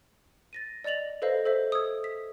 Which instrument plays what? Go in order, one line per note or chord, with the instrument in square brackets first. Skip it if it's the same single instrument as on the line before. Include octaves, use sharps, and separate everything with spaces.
[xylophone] A6 A#6 D#7
D5 D#5 A6 F7 F#7
A4 B4 C5 D#5 F5
A4 C5 E5
D#6 E6 G#6
B6